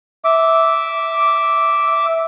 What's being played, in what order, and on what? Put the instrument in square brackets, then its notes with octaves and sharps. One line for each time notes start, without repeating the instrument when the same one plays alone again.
[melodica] E5 D6